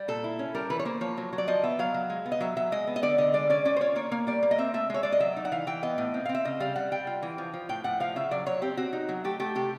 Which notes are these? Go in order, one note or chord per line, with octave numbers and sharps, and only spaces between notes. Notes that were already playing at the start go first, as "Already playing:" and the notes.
Already playing: G3
A#2 A4
E4
C#4
G3 A#4
E3 B4
C#5
A#3 C5
F3 C#5
F#3
F#3
D5
F3 D#5
B3 E5
F#3 F5
F#3
G#3
B3
D#5
F#3 E5
F#3 E5
G#3 D#5
B3
D#5
D3 D5
D3 D#5
G#3 D5
C#4 D5
C#4 D5
C5
F4 C#5
A#3 C#5
A#3
G3 D5
A#3
D#5
C4 E5
A3 E5
G#3 C#5
G#3 D5
D#5
F#3 E5
D#4
F#5
E3 F5
E3 G5
B3 D#5
A2
C4
F5
C4
E5
C#3 D#5
G3 F5
G3 F#5
G3 G5
F4
E3
F3
F3
A2 G5
A2 F#5
F3 F5
C#3 E5
F#3 D5
F#3 C#5
C4 G4
C4 F#4
D#4
F#3
A3 G4
A3 G4
C3 G4